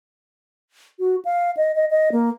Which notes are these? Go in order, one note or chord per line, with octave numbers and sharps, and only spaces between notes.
F#4
F5
D#5
D#5
D#5
A#3